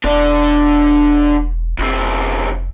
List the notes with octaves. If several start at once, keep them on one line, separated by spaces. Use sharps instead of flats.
E1 D3 D4
F1 C#2 C4